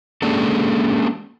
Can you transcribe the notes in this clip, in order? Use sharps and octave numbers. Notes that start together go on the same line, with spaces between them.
G#3 A#3 C#4 D4 G4 A4